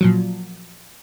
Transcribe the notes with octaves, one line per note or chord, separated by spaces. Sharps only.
A#2 F3 F#3